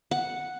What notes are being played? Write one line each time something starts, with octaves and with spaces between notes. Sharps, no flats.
F#5